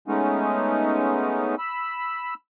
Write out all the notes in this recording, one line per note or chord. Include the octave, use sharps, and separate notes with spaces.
G#3 A3 B3 C#4 D#4
B5 E6